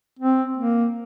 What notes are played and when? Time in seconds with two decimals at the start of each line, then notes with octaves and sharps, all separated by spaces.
0.19 C4
0.57 A#3